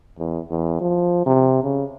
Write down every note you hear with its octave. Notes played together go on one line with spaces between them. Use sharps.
E2
E2
F3
C3
C#3